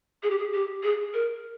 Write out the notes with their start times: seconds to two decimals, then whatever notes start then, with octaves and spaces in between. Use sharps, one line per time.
0.23 G#4
0.30 G4
0.38 G#4
0.54 G4
0.83 G#4
1.14 A#4